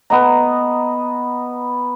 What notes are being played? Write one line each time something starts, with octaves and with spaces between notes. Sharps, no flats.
B3 D#5 A#5